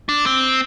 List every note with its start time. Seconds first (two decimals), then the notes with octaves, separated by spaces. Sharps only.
0.09 D4
0.26 C4